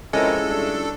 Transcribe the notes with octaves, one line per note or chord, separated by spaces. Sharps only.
F2 C3 G#3 C#4 E4 F4 A4 A#4
G3 A3 D4